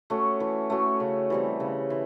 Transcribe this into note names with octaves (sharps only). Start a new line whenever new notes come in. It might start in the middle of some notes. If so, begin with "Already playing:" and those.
A3 C#4 F#4
E3
A3 C#4 F#4
C#3
E3 G3 C4
C#3
E3